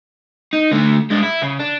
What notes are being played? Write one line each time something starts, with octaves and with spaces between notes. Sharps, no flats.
D#4
D3 A3
G#3 D4
E4
C#3
D4